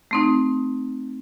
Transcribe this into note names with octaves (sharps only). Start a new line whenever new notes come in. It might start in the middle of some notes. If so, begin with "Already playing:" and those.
A3 C4 D#4